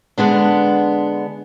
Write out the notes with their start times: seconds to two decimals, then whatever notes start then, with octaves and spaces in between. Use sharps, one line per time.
0.18 D3 G#3 B3 D4